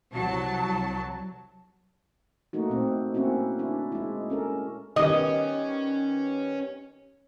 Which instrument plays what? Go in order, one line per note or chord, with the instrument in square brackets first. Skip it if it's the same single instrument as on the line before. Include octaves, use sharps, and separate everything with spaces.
[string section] C2 F#3 A5
[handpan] A3 A#3 D#4 F#4
A#2 C4
A#3 C4 C#4 E4 F#4
D4 E4
G#3 E4
C#4 A4 A#4
[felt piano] D#3 G3 B3 [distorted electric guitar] C#4 [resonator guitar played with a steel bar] D#5